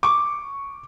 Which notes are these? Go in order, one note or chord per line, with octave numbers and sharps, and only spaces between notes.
C#6 D6